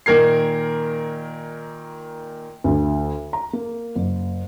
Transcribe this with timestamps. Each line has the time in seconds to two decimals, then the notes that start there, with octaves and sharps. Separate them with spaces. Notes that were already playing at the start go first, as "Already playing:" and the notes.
0.06 A#2 D#3 A#4 G#6 C7
2.64 D2
3.33 A#5
3.53 A#3
3.95 F#1